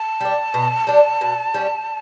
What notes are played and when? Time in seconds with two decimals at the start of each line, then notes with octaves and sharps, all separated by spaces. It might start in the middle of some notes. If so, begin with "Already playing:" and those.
Already playing: A5
0.21 G3 D4
0.54 B2
0.87 G3 D4
1.21 B2
1.54 G3 C#4